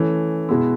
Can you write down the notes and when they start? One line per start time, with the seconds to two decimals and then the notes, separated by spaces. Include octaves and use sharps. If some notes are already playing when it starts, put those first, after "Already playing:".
Already playing: E3 A3 C#4
0.49 B2 G#3 B3 E4